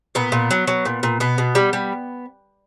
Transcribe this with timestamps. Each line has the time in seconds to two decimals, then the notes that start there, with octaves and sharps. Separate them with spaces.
0.15 A#2 B3
0.32 A#2
0.51 F#3
0.67 F#3
0.85 A#2
1.03 A#2
1.20 B2 B3
1.38 B2
1.55 G3
1.73 G3